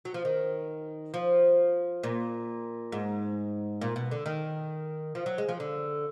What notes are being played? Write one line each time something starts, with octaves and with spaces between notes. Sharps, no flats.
F#3
F3
D#3
F3
A#2
G#2
A#2
B2
D3
D#3
F3
F#3
G#3
F3
D3